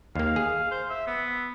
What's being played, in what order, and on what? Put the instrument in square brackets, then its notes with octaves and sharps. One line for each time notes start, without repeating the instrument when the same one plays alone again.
[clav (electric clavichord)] D#2 A#3 [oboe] F5
[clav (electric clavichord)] G#4
[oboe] C5
E5
B3